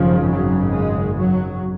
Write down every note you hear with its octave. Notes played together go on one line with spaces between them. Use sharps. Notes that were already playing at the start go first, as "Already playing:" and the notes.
Already playing: G#1 F#2 C#3 F3
F#3
G#3
F#3